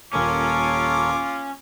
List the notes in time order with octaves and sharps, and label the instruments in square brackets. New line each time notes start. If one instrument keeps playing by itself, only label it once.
[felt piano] D#1 A#3 [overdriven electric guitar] C#4 [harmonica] F4 D6 [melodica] A4 A#4 C#5